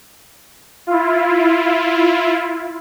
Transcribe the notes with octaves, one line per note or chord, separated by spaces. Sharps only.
E4 F4